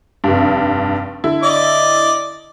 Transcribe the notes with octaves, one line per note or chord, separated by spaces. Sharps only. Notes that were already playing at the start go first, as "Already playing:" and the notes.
F1 G2
D3 E4
D5 D#5 D6